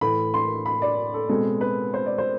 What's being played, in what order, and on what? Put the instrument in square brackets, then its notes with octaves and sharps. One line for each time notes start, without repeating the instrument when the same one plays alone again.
[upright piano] A2 E3 A3 B5
C6
B5
D5
A4
B2 G#3 C4 A4
B4
C5
D5
C5